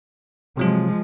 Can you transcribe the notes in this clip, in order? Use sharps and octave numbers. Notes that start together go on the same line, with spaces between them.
C3 F3 F#3 G#3 F4